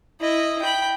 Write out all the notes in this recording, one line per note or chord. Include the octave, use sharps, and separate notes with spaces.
E4 D#5
G5 B5